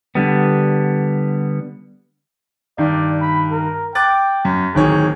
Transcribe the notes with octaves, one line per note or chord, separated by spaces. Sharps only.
D3 G3 B3
G2 D#3 D5
B5
A#4
G5 D6 F#6 A6
F#2
D1 D#3 G#4 C#5